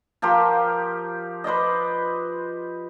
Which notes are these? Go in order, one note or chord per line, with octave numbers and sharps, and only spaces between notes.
F3 G4 A#4 C5
B4 C5 D5 D#5